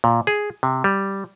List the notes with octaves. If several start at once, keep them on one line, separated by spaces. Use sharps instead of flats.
A#2
G#4
C3
G3